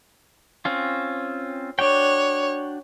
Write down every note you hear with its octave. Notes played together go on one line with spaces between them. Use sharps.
C4 C#4 F4
D4 F#4 C#5 G5